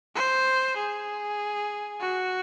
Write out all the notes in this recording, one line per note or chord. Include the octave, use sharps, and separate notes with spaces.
C5
G#4
F#4